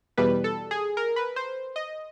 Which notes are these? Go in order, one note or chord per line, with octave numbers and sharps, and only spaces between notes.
E2 B2 G3 B4
A4
G#4
A#4
B4
C5
D#5